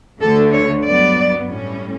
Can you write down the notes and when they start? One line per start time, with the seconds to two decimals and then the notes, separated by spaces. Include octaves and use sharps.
0.21 D2 D3 A3 A4
0.53 C#5
0.85 G2 F#3 B3 D5
1.48 A2 G3 C#4